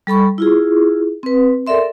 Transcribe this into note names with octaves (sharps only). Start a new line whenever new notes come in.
G3 A4 B5 C#6
E4 F4 G#4
C4 B4
A4 A#4 D5 E5 C6